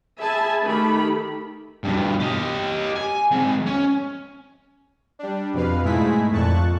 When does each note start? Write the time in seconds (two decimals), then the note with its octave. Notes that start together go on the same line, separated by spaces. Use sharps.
0.20 G#4 E5 G#5 A5 B5
0.61 D#3 A3 G4 A4 B5
1.84 G2 B2
2.20 G4 D#5
2.96 G#5
3.31 G#3 C4
3.66 C#4
5.19 G3 D4
5.53 F2 B2 B4 F5
5.84 G#2 G#3 A3 E4 G#4 B6
6.31 F2 A#2 A5 C#6 F#6